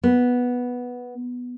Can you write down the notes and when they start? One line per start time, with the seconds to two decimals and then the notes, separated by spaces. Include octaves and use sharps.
0.03 B3